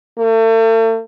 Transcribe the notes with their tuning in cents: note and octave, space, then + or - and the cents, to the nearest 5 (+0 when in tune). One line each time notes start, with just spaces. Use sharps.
A3 +40